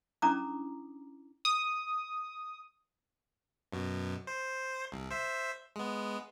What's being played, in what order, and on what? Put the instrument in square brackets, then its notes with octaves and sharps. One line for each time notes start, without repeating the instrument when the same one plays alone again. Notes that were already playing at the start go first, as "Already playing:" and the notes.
[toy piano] C#4 D4 E4 A#5 D6 D#6
[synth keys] D#6
[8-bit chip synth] F#2 B2
C5
C2
C5 E5
G#3 B3